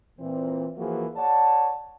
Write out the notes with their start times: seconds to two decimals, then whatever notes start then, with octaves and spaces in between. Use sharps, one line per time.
0.19 A#2 E3 C4
0.78 E3 F3 A#3 F#4 G#4
1.17 C#5 D5 F#5 A5